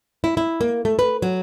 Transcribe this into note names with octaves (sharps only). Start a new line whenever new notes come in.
E4
E4
A#3
A3
B4
F#3